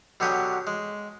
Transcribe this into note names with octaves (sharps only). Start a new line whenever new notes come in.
B2 D3 F#3 G4 C#5 D#6
G#3